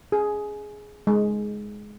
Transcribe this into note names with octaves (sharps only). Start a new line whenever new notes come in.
G#4
G#3